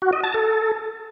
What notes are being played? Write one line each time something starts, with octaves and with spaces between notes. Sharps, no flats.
F#4
D#5
A5
A4